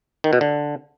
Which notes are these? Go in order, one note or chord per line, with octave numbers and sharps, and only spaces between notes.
D#3
B2
D3